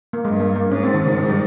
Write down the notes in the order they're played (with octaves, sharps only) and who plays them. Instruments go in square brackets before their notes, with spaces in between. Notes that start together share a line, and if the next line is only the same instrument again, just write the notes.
[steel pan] A#3
[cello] G2 [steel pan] G#3
[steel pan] A#3
A#3
[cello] G#2 [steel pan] C#4
[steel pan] C4
D#3
C#3
D#3
G3